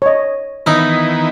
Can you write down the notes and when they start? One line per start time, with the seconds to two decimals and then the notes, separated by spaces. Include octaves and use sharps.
0.02 C#5 D#5
0.66 D#3 E3 B3 D#4 E4